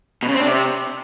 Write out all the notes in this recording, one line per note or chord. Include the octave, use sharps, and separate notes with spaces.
B2
C#3
C4
D4
C3